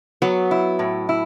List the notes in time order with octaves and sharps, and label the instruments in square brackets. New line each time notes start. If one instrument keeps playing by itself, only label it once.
[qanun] F#3 [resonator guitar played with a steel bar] B3
[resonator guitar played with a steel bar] E4
A2
E4